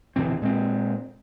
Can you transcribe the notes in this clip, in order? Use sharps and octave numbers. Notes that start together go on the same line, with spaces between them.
D1 B2 E3 C4
A#2 G#3 C4